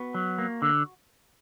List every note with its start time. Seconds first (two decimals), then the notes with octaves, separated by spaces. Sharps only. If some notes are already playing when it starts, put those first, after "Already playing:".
Already playing: B3 F#4
0.14 F#3
0.39 A#3
0.62 D3